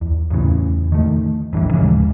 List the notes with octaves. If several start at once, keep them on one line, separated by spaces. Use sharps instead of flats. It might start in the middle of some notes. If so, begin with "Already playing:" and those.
E2
E2 A2 C#3 E3
D#3 A3
A1 G2 D#3 E3
D#1 C#3 F3 G#3